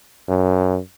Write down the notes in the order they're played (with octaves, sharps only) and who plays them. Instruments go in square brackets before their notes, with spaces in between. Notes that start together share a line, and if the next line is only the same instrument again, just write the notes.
[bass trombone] F#2